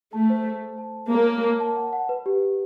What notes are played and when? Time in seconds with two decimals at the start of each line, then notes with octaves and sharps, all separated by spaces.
0.13 A3 A5
0.30 C5
0.45 C5
0.62 A4
0.78 A5
0.94 A5
1.11 A#3 C#5
1.27 C#5
1.44 A5
1.60 A5
1.76 F#5
1.93 F#5
2.09 B4
2.26 G4
2.42 G4